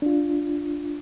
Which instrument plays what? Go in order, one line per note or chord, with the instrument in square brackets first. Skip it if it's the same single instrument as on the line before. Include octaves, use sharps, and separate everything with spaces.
[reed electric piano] D4 F4